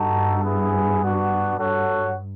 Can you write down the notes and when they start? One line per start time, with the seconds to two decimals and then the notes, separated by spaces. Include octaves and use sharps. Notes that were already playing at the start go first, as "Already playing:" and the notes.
Already playing: G2 D#4 F#4 A4
0.43 B3 E4 G#4
1.01 B3 D4 F#4
1.58 G2 F#4 A4 C#5 F#5